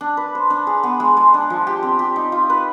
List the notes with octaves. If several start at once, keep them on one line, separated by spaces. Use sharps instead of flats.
D4
B4
C5
D4
G#4
B3
G#3
G#3
D4
F3
G4
C4
G4
D#4
F4
B4